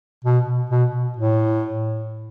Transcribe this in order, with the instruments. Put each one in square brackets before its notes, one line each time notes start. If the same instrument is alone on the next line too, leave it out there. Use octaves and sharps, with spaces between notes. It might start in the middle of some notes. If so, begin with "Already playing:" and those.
[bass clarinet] B2
B2
A2